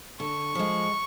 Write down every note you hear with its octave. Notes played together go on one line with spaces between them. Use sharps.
D3 C#6
F3 G#3